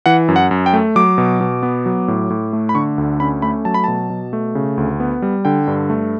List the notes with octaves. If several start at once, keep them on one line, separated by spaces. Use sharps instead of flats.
E3 F#5
F#2
F#5
F#2
G5
A3
F#3 D6
B2
B2
B3
F#3
A2
A2
A3
B5
D3 C#6
D2
C#4 B5
A3 B5
F#3 A5
B5
B2 A5
B2
A3
C#3
D2
B3
G3
D3 G5
G2
A3